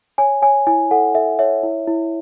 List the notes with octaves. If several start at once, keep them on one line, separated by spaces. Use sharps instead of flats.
C#5 G#5
C#5 G#5
E4 G#5
A4 F#5
A4 E5
C#5 E5
E4
E4